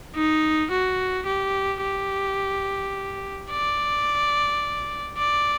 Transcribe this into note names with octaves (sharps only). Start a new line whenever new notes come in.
D#4
F#4
G4
G4
D5
D5